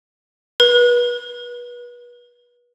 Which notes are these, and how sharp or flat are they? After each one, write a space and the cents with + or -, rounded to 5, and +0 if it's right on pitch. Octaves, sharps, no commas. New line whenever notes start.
B4 -35